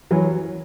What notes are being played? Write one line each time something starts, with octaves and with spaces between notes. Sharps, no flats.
E3 F#3